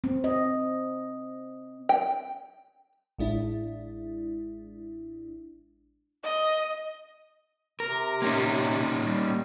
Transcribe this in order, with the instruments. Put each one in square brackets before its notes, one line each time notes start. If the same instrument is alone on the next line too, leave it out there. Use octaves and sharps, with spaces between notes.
[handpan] C4
D#5
[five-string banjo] G5
[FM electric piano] A1 G#3 D4 E4
[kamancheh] D#5
[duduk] C3 [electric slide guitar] A#4
[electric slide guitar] A#3 C#4 D#4
[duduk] G3